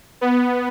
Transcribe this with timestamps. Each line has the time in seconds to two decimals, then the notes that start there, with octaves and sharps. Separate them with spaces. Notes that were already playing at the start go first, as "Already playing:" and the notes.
0.21 B3